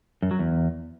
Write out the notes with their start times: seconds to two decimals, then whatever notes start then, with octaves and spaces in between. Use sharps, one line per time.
0.22 F#2
0.31 F#3
0.39 E2